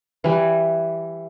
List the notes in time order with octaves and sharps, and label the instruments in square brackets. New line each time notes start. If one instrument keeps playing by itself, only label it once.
[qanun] E3 G3